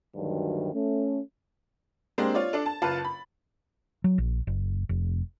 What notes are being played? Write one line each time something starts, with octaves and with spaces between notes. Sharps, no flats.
D2 G2 D#3 F#3
A3 C#4
G#3 A#3 C4 D4 G4 C5
F4 C#5 D5
D4 A4 D5
A5
F#1 F4 B4 A5 A6
B5
F#3
A#1
F#1
F1